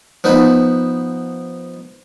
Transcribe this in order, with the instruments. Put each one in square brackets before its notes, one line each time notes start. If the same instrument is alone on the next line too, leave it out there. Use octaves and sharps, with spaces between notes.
[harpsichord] F3 B3 D#4